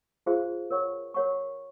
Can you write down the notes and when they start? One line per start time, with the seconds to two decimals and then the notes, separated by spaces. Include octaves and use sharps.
0.26 F4 G#4 C5 F5 C6
0.71 A#4 C#5 F#5 C#6
1.14 A#4 C#5 F#5 C#6